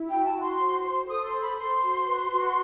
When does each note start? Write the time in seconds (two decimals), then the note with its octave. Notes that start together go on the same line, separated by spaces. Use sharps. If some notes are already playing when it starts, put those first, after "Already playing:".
Already playing: E4
0.09 F#4 G5
0.25 A5
0.33 F#4
0.41 C6
0.58 C5
0.83 C5
1.07 A4 D#6
1.24 C6
1.32 C5
1.41 B5
1.56 C5 C6
1.82 F#4
2.06 B4
2.31 F#4